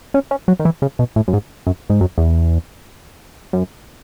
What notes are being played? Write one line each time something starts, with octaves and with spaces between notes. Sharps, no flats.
C#4
C#4
F#3
D#3
E3
C#3
B2
A2
F#2
G#2
F#2
G#2
F#2
E2
F#2